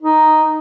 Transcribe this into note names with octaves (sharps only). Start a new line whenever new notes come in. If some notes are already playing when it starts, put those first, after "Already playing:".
D#4